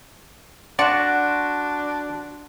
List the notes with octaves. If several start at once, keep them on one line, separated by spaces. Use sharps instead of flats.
D4 F#4 D5 C6 F#6 E7